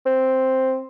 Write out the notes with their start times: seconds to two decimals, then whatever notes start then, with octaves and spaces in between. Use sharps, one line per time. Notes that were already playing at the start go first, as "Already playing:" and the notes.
0.06 C4